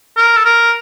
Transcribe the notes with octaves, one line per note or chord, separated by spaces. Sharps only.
A#4
A4
A#4